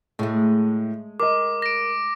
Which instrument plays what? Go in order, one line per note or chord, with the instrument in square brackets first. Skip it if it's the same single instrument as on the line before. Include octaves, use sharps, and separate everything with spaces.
[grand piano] A2 [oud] G#3 A3
[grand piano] A#4 D#5 [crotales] D6
[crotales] A#6 D7